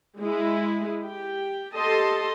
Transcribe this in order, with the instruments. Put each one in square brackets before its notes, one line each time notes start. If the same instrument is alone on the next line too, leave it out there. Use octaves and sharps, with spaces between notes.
[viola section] G#3 E4
G4 G5
G4 A4 D#5 A5 C6